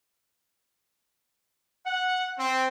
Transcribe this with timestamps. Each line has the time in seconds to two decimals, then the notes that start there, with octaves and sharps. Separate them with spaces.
1.87 F#5
2.38 C4